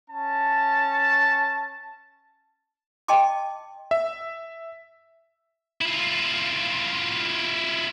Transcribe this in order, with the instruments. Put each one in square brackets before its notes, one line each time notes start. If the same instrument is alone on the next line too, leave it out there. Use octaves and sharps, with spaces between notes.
[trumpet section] C#4 A5
[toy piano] D#5 G5 A5 C6 D6
[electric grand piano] E5
[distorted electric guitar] E4 F4